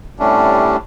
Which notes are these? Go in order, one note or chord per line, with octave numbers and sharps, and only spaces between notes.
A2 C3 G3 A3 C#4 D4